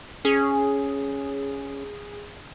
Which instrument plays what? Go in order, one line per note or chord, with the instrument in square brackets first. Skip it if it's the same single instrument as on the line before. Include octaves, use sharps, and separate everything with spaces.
[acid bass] C#4 [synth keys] G#4